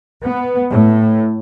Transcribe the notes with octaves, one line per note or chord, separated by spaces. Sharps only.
B3
A2